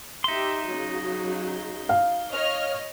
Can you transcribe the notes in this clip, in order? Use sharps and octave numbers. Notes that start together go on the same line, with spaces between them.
D#4 G4 E5 C6
C#3 F#3
F5
C#5 D#5 F6